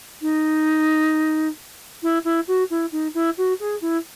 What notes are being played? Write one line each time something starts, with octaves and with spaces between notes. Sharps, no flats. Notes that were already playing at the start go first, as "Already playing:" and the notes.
D#4
E4
E4
F#4
E4
D#4
E4
F#4
G#4
E4